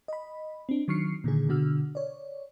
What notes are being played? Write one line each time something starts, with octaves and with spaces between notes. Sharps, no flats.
D#5 B5
C4 D4
D#3 F#3 C#6 F6 C7 C#7
A#2 D3 D#3 G#4
B2 D3 F#4 E6 F6
C#5 D5